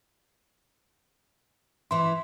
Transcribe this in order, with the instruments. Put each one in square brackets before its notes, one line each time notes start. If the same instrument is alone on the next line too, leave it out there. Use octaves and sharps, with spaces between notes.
[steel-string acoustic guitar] E3 E4 [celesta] C6